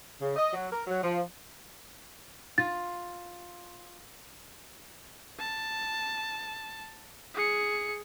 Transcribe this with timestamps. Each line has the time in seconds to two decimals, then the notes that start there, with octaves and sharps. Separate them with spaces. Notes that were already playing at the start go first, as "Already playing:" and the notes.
0.21 C#3
0.36 D#5
0.53 F#3
0.72 A#4
0.87 F#3
1.03 F3
2.58 F4 A6
5.39 A5
7.35 G#4 C#7